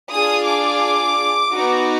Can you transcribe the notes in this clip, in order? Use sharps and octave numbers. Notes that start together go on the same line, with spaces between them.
D4 F4 G#4 D#6
D6
B3 D#4 F#4